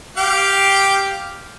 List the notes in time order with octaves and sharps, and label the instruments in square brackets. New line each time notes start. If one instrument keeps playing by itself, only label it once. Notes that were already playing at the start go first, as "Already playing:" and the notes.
[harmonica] G4 F5 G5